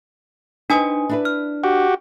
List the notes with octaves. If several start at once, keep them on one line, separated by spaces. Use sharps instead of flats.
D4 D#4 B4 C5 G#5 D#6
D4 E4 B4
F6
F#4 G4